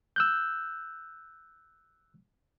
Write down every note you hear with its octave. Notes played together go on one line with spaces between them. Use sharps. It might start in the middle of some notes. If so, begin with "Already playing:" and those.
E6 F#6 G6